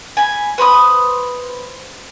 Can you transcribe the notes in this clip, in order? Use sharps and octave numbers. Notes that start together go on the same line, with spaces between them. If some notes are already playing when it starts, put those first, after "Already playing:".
G#5 B5
B4 C5 B5 D#6